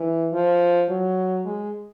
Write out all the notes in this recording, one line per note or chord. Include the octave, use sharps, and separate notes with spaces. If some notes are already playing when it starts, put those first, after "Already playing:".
Already playing: E3
F3
F#3
G#3